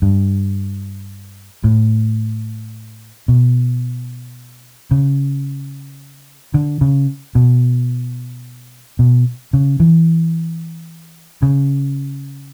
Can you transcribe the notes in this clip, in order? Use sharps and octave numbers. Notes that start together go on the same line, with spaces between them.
G2
A2
B2
C#3
D3
C#3
B2
B2
C#3
E3
C#3